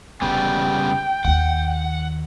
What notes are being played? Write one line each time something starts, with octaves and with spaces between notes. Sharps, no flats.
F1 C#3 G3 B3 G5
D#2 D#3 F#5